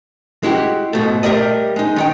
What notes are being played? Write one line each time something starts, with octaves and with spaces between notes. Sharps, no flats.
G#3 E4 F#4 G4
G#2 B2 A3
G3 A3 G4 A#4 D5 D#5
G#3 D#4
D#3 D#4 G5